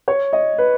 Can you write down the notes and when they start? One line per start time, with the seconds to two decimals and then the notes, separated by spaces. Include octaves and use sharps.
0.08 C#5
0.33 D#5
0.58 B4